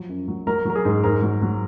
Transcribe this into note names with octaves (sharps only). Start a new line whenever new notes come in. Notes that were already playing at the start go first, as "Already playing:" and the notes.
Already playing: F3 F#3
F#2
F#3
F#3 A#4
F#3 A#4
G#4
G#2
G#2 A#4
F#3
F#3